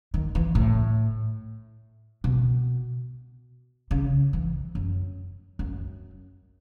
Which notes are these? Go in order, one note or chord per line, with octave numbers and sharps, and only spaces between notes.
D#3
E3
A2
B2
C#3
E3
F#2
F#2